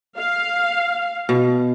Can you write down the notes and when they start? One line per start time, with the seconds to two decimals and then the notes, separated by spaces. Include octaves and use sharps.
0.17 F5
1.29 B2